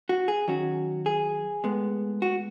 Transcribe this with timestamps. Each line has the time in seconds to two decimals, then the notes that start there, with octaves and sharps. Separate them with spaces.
0.09 F#4
0.28 G#4
0.48 D#3 F#3 C#4 F#4
1.06 G#4
1.64 A2 G#3 B3
2.22 F#4